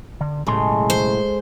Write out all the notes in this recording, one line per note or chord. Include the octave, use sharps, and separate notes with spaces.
D3
B1 A2 C#3 G#3 C6
C5